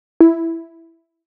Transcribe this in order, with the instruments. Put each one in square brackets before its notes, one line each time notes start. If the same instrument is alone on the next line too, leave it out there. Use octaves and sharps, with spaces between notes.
[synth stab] E4